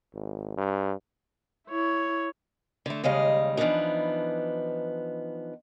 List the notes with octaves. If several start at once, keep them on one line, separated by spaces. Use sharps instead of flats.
G#1
G2
E4 C#5
D3 A3
D#2 C#3 G3 G#3 D#5 F5
E3 F3 G3 B3 D4 D#4